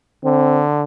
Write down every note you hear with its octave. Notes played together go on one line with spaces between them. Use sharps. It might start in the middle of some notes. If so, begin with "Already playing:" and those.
D3 C4